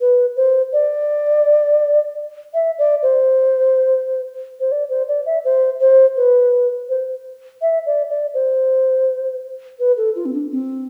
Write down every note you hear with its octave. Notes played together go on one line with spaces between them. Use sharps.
B4
C5
D5
E5
D5
C5
C5
D5
C5
D5
E5
C5
C5
B4
C5
E5
D5
D5
C5
B4
A4
F4
C4
D4
C4